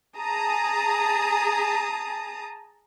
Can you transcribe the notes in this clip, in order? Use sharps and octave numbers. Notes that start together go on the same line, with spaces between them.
G#4 A5 A#5 D#6